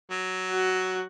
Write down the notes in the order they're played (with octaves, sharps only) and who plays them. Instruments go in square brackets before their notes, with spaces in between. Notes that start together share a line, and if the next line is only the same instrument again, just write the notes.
[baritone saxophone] F#3
[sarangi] F#4